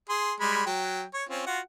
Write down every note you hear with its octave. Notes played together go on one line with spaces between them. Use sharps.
G#4 C6
G3 G#3 B5
F#3 G5
C#5
C4 C#4 F4
F4 F#4 F#5